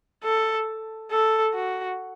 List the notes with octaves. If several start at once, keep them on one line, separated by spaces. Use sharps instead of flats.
A4
A4
F#4